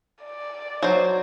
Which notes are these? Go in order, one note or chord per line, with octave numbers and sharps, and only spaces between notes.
D5
F#3 C5